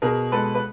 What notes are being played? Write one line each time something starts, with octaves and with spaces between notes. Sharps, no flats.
B2 G#4 A#4
G#3 A4 B4
B4